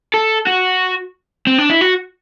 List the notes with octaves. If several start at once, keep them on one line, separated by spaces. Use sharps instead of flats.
A4
F#4
C4
D4
E4
F#4